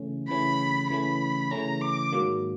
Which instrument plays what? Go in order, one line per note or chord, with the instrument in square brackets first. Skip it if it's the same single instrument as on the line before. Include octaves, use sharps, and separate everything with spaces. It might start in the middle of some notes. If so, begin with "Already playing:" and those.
Already playing: [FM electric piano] C#3 E3 A3 C#4
[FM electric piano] C#3 E3 A3 C#4 [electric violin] B5
[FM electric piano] C#3 E3 A3 C#4 [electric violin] B5
[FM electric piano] C#3 E3 A3 C#4 [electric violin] A#5
[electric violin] D6
[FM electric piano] G#2 D#3 F#3 A#3